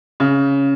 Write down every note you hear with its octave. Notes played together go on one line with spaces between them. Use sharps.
C#3